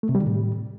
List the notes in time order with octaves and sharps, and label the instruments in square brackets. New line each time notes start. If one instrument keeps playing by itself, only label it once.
[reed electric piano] A3
C3
G3
D#3
A2